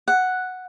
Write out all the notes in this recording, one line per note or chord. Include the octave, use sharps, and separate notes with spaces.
F#5